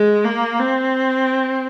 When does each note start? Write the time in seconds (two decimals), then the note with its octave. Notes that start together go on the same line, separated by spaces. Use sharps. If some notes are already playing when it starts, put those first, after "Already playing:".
Already playing: G#3
0.25 A#3
0.59 C4